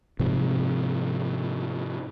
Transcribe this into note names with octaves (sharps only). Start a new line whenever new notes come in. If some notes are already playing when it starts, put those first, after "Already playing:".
G#2 C3 F3